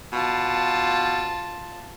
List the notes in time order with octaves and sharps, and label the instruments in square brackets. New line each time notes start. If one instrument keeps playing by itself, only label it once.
[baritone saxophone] B2 [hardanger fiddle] F4 A5